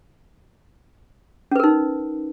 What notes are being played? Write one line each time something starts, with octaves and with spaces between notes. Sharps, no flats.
C#4 D#4 A#4 B4